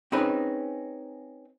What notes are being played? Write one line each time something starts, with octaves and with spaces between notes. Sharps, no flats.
C4 C#4 D#4 G#4 B4